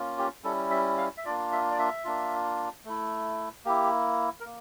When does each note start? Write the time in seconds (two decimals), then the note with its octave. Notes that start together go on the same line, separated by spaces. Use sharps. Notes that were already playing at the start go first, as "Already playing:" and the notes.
Already playing: A#3 C#4 F4
0.18 G4
0.44 G3 C#4 E4 A4
0.71 E5
0.97 F5
1.17 E5
1.25 A#3 D4 F4 D5
1.52 E5
1.71 D5
1.79 E5
2.05 A#3 D4 F4
2.85 A3 E4
3.65 A#3 E4 G4
4.40 A#4
4.45 A#3